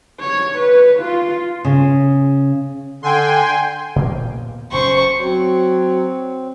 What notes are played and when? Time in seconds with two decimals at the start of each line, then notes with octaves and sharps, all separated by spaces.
0.20 C#5
0.58 B4
1.00 F4
1.65 C#3
3.03 D3 G5 G#5 C6
3.96 A#2 A#3 B3
4.72 F#1 E2 C#4 C5 C#6
5.20 F#3 C4